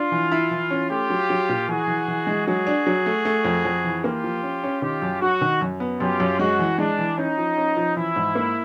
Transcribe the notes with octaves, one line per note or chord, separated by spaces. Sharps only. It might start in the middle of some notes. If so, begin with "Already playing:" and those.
Already playing: D4 F4
E3
E4
E3
C#4
A3 F4 G4
F#3
F#3
A#2
E3 F#4 G#4
E3
E3
G#3
F#3 F#4 G#4
D4
F#3
A3
A3
F2
F2
E3
A#3 F4 G4
F3
C#4
C#4
D#3 F4 G4
F#2
F#3 F#4
D#3
F#2
B3
F#2 F4 G4
F#2
G#3 F#4
E3
G#3 D4
E3
C#4 D#4
F3
C#4
F3
E3 E4
G#2
A#3